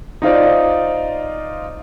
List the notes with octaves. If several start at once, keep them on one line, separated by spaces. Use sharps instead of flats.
D#4 F4 C5 D5